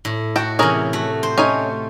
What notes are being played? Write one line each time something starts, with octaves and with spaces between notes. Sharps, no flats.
A2
F#4 A4 G5
C3 E3 C#4 G#4 A#4
A3 F#4
C5
A3 C#4 D#4 G#5